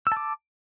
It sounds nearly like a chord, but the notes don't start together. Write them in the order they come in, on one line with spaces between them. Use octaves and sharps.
E6 A5 D6